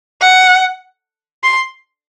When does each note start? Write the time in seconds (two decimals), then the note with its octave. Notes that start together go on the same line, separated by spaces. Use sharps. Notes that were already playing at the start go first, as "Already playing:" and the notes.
0.21 F#5
1.43 C6